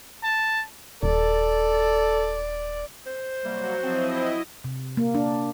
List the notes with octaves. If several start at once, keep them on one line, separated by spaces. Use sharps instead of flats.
A5
D#1 A4 D5
C5
C3 F#3 G3 A#3 F#4
F3 C4 E4 D#5
C3
A#3
D4